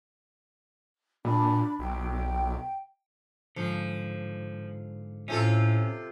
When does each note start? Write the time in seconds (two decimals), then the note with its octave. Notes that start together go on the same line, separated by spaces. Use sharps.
1.25 A#2 D4 B5
1.79 B1 G5
3.56 G#2 D3 F3
5.28 A2 C3 C#4 F4 A4